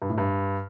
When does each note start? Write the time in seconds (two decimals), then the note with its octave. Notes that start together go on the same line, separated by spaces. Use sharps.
0.02 G2
0.10 A2
0.18 G2